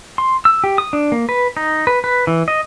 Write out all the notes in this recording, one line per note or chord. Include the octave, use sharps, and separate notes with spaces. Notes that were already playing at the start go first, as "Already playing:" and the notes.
C6
E6
G4
D#6
D4
A#3
B4
D#4
B4
B4
E3
D#5